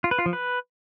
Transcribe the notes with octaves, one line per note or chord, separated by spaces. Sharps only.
F4
B4
F4
F3
B4